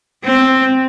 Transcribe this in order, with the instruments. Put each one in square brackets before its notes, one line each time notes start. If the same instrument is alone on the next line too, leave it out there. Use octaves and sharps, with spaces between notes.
[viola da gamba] C4